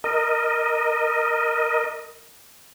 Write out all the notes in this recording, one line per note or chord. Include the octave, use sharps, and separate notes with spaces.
A#4 D#5